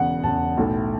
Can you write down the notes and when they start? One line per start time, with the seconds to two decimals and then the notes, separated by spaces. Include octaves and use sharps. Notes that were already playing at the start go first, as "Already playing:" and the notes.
Already playing: E1 E2 C#3 F#5
0.24 E1 E2 C#3 A5
0.57 B1 A2 A3